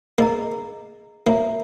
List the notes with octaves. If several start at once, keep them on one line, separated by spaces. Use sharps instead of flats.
A#3 G#4 D#5 A#5
A#3 F#4 C#5 E5 A#5